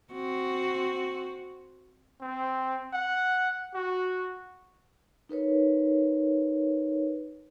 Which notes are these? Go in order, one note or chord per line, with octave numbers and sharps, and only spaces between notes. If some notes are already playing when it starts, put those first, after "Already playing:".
C4 F#4
C4
F#5
F#4
D#4 A#4 B4 C#5